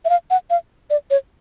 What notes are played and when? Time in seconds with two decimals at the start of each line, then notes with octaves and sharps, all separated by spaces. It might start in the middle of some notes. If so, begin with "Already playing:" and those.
0.05 E5
0.10 F5
0.31 F#5
0.50 F5
0.90 D5
1.11 C#5